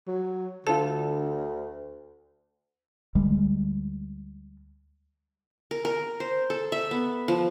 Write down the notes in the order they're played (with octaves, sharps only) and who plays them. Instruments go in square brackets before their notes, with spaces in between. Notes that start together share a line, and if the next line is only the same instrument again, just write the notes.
[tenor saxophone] F#3
[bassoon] D2 [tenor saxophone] D3 [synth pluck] F4 A4 [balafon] A5
[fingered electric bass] D2 G3 G#3
[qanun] A#4
A#4
C5
A4
E5
B3
F3